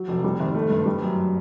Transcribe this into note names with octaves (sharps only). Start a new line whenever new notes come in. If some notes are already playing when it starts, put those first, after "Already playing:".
Already playing: F#3
F1
G3
G#1
A3
G2
G3
F#2